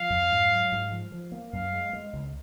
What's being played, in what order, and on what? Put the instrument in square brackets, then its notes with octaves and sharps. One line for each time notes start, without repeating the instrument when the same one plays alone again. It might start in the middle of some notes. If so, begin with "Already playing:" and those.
Already playing: [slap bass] F3 [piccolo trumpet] F5
[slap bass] F2
G#2
F#3
G#2
F3
F3
A#3
[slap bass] F#2 [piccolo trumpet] F5
[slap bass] G#3
G#3
C#2